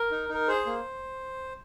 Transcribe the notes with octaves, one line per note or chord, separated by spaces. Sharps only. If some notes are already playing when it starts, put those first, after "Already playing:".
Already playing: A#4
D#4
D#4
A#4
G#4 C5
A#3